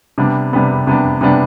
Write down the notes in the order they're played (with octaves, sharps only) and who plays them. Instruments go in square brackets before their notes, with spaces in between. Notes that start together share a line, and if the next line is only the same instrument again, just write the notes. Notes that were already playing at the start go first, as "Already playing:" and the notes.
[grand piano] C3 G3 B3 D4
C3 G3 B3 D4
C3 G3 B3 D4
C3 G3 B3 D4